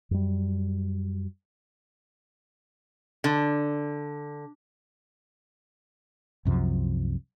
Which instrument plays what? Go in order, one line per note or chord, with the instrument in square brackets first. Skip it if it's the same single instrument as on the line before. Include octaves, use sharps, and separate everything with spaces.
[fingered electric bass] F#2 G3
[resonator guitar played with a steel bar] D3
[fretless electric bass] C2 F#2 C3 F3